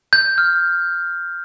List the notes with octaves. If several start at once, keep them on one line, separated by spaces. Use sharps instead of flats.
G6
F6